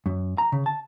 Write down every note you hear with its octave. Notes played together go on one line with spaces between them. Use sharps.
F#2
A#5
C#3
A5